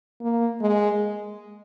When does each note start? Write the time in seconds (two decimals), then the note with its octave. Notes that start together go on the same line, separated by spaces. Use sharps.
0.21 A#3
0.61 G#3